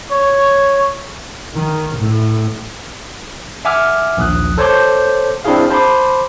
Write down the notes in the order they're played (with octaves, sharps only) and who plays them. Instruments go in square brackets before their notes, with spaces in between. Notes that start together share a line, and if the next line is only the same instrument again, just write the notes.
[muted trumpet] C#5
[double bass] D#3
A2
[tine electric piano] E5 F#5 G#5 D6 E6 F6
A#1 D#2 D#6 F#6
A4 C5 C#5 A5 D6 G6
C4 D4 E4 F#4 G#4 F5
C5 A5 B5 C6 D6